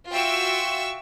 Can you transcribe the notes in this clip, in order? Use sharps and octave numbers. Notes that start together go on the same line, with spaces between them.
F4 F#4 E5 G5 C#6 E6